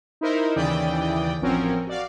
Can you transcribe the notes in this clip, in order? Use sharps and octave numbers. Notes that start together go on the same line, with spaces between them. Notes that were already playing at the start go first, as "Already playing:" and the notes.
D#4 E4 A#4 C5
D#2 C#3 E3 D5 G5 D#6
A1 F3 F#3 C4 C#4 A#4
F#4 D5 F5